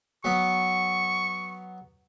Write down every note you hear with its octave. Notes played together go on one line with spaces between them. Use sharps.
F#3 B3 C#6